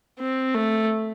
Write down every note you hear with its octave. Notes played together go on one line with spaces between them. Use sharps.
C4
A3